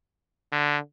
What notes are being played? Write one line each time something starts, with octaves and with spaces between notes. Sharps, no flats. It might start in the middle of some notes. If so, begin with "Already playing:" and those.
D3